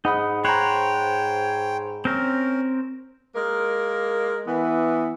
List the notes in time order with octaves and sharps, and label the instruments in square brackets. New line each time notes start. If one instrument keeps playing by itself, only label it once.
[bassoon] G#2 [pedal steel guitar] D#4 [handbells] F#5 B5 D#6
[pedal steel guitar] C5 C#5 F#5 [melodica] G5 [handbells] A#5 B5
[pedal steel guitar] C4 A#4 [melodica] C#4
[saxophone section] G#3 A#3 A#4
E3 B3